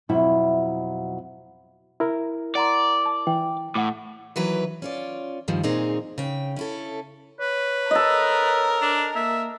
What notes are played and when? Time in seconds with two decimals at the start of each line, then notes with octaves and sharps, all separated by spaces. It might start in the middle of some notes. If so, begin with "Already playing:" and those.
0.09 F2 B2 F#3 E4 E5
2.00 E4 A#4
2.55 D5 F#5 A#5 C6
3.06 A5
3.27 E3 G5
3.75 A2 F#5 D6
4.36 D#3 E3 F#3 B4
4.82 C#4 F4 D5
5.48 E2 G2 D#3 F3
5.64 A#2 C4 D#4 G#4
6.18 C#3 G5
6.56 C#4 E4 A4
7.40 B4 C#5
7.91 A4 A#4 D#5
8.82 D4
9.15 A#3 E5